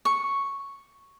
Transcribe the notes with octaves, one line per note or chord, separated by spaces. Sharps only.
C#6